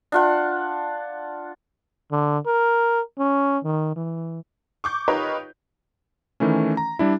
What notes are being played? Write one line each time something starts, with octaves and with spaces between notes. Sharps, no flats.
D4 F4 F#5
D3
A#4
C#4
D#3
E3
C#6 D6 G6
D#4 F4 G4 A#4 B4 C#5
D#3 E3 A3 C#4
A#5
G3 D4 E4